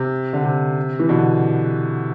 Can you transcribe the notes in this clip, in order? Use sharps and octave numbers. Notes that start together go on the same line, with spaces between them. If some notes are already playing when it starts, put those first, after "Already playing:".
Already playing: C3
D3
C3
E3
B2 D3